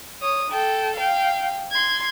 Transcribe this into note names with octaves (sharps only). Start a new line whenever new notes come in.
C#5 D#6
A4 G5
F5 G5
C6 G#6